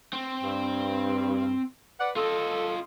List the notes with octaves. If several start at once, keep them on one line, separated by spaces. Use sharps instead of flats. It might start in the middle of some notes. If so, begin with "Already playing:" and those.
C4
G2
B4 D5 F#5
F4 A4 D#5